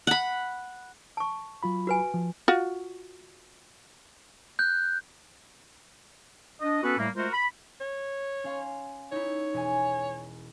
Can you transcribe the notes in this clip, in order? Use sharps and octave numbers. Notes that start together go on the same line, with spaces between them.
F#5 B5
A5 C#6
F#3 F4 B5
F#4 B4 G#5
F3
F4 F#4
F#6 G6
D4 D#5
B3 C#4 F#4 A4 B4
A2 G3 A3 A#3
G#3 A3 F4 F#4 A#4 C5
B5
C#5
C#4 F5 C6
D#4 E4 C#5
E1 G#5